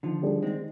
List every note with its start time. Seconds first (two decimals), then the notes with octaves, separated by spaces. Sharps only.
0.03 D3 D#3 F3
0.22 G3 D4 G#4
0.43 D#3 G#3 C4